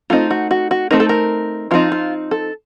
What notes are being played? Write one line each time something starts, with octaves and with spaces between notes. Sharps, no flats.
A3 C4 D#4 F4
F#4
F#4
F#4
A3 C4 D#4 A#4
A4
A#4
F3 C4 D#4 F4
F4
A4